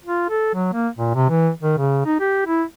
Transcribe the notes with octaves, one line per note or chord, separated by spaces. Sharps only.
F4
A4
F#3
A#3
A#2
C3
E3
D#3
C#3
D#4
G4
E4